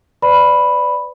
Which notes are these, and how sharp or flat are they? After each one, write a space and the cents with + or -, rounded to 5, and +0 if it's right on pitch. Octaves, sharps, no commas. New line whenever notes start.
B4 +35 D5 +0 B5 +0